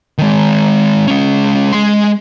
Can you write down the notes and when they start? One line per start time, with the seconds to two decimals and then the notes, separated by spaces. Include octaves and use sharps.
0.18 D#3 G#3
1.07 G#3 C#4
1.73 G#3 C6